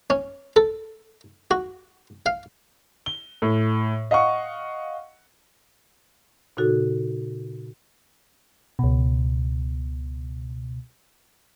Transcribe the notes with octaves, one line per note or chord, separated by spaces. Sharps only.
C#4
A4
F#4
F5
G7
A2
D#5 F5 F#5 C#6
A#2 C#3 D#4 F#4 A4
C#2 B2